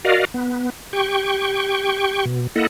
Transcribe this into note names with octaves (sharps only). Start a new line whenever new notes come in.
F#4 A#4 D5 D#5 F5
B3
G4 G5 C#6
B2
A#3 E4 A4 D#5 F#5